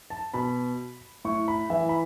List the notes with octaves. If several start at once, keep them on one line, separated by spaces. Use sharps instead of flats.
A5
B2 B5
A2 C#6
B5
E3 E5
B5